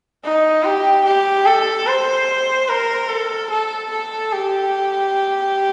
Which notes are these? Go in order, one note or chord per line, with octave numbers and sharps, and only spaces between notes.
D#4
G4
G4
A4
C5
A#4
A4
A4
A4
G4